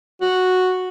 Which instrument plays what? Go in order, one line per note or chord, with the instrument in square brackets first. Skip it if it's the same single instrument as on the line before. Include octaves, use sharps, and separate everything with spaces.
[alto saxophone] F#4